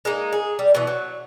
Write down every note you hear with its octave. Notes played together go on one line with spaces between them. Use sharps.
G#3 A#3 D#4
G#4
G3
B2 E3
F#3